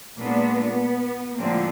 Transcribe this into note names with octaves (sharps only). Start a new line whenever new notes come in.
A#2 G#3 B3 D4
B3
A2 D3 F3 G#3 A#3 C4